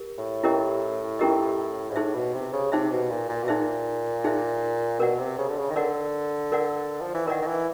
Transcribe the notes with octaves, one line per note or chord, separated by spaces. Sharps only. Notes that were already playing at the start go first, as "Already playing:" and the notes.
Already playing: G4 A#4
A2
C#4 E4 G4 A#4 D#5
C#4 E4 G4 A#4 D#5
G#2
A2 D#4 G#4 C5 E5
B2
C3
C#3
C3 D#4 G#4 C5 E5
B2
A#2
A#2
B2
A#2 D#4 G#4 C5 E5
D#4 G#4 C5 E5
B2 A#4 D5 F#5
C3
C#3
D3
C#3
D#3
D3 A#4 D5 F#5
A#4 D5 F#5
F3
E3
D#3 A#4 D5 F#5
D#3
E3